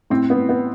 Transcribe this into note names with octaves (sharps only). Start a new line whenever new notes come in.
A2 C4
B3
A2
B3